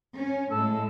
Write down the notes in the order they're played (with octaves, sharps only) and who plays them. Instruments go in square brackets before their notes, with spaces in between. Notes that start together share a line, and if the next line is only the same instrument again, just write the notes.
[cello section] C#4
[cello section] A2 G#3 [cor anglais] A4